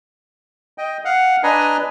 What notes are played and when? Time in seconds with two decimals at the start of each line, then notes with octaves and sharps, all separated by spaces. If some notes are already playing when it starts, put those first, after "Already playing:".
0.78 D#5 G5
1.05 F5 F#5
1.43 D4 B4 D#5 G#5 A#5